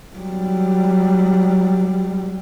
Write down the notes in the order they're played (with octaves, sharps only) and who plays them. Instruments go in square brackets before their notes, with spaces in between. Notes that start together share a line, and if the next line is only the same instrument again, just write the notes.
[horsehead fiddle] F#3 G3